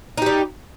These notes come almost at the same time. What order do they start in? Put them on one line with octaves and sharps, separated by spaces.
D#4 G4 G3